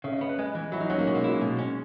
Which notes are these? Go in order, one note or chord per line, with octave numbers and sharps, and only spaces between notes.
C#3 E5
D#5
B3
B4
G#3 D#5
E3
F#3 E4
D#4
F#3 C#4
A#3
B2 G#3
A#3
F#3 E4
B2 G#3
C#4